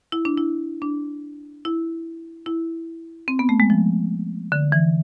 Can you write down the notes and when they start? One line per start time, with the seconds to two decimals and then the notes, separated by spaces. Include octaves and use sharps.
0.12 E4
0.25 D4
0.37 E4
0.82 D4
1.65 E4
2.46 E4
3.28 C4
3.39 B3
3.49 A3
3.60 G#3
3.70 F3
4.52 D3
4.72 E3